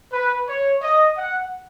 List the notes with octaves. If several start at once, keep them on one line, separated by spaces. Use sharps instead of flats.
B4
C#5
D#5
F#5